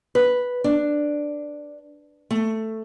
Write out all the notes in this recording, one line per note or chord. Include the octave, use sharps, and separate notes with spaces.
B4
D4
A3